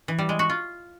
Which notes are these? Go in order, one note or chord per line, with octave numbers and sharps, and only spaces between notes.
E3
G3
G#3
F#4
F4